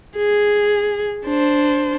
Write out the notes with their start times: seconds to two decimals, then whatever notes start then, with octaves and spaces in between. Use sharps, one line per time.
0.17 G#4
1.26 D4 C5